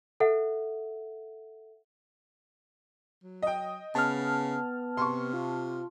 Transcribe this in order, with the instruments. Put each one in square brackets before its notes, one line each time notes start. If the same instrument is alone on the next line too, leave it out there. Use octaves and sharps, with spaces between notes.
[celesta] A4 E5 F#5
[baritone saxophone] F#3
[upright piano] D#5 G5
[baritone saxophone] C#3 [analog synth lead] B3 [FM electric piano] A5 F6
[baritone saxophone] C3 [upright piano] C6 C#6
[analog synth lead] F4